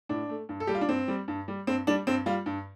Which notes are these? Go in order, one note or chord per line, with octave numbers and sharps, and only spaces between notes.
A2 D4
A3
G2
A4
G3 G4
F4
D4
G2 C4
G3
G2
G3
G2 C4
G3 D4
G2 C4
G3 F4
G2